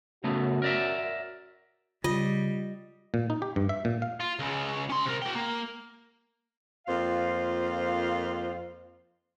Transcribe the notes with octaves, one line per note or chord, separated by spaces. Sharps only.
F#2 C#3 A3 B3 F#4
A#4 D5 E5
C#3 G3 F4 D#5
A#2
D#4
G4
G2
E5
A#2
F5
F4
C#2 C#3
C#4 C6
C3 A#4
F#4 G5
A#3
F2 A#3 F4 C5 F5